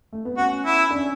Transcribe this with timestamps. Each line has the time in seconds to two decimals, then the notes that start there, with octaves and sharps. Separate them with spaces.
0.13 A3
0.25 B3
0.37 C#4 F#4
0.66 E4
0.90 D4
0.95 C#4